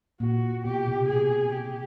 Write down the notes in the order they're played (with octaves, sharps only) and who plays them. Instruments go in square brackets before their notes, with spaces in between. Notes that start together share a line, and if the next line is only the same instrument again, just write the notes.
[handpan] A#2 [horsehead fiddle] F#4
[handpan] B2 [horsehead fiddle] G4
[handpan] C3
[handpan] C3 [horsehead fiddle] G#4
[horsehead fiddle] G4